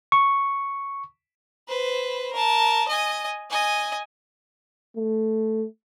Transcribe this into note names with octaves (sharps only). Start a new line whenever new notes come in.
C#6
B4 C5
A#4 A5
D#5 G#5
D#5 G#5
A3